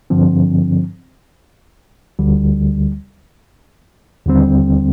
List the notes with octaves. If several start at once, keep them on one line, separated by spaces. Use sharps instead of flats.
G2 D3 F3 C4
D2 D3 G3
D#2 D3 G3 C4